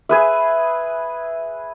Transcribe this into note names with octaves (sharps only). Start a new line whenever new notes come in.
G#4 B4 E5